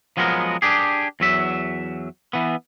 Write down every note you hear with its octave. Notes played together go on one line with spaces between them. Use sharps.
F3 F#3 G#3 B3 A#4
D4 G4 G#4
E2 F#3 E5
E3 B3